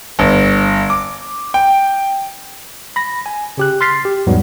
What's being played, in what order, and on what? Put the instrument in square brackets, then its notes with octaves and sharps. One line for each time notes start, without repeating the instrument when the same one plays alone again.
[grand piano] G1
D6
G5
[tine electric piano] B5 A#6
G#5
C#3 G4 F#6
C6 F6 A6 B6 C7
G4
E2 G#2 F#3 G3 B3